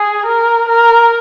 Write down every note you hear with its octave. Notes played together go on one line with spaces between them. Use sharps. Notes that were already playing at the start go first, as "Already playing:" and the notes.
Already playing: G#4
A#4
A#4